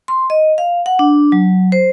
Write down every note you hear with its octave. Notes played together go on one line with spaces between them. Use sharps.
C6
D#5
F5
F#5
D4
F#3
C5